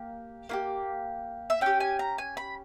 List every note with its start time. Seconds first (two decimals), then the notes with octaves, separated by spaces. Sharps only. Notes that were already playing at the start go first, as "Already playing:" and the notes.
Already playing: A#3 G4
0.49 A#3 E4 G4
1.50 E5
1.61 C#4 G4 G5
1.80 G#5
1.99 A#5
2.18 G#5
2.37 B5